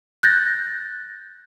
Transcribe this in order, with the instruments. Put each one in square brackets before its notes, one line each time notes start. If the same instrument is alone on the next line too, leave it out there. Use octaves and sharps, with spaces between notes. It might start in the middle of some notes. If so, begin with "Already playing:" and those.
[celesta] F#6 G6 A6 A#6